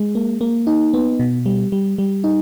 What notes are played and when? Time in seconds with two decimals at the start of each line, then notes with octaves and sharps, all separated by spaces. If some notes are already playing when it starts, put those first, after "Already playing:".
Already playing: G#3
0.15 A#3
0.41 A#3
0.67 D#4
0.94 B3
1.20 B2
1.46 G3
1.72 G3
1.98 G3
2.24 D#4